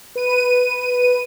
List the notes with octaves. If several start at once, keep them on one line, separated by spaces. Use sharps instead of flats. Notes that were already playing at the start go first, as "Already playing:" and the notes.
B4 D#7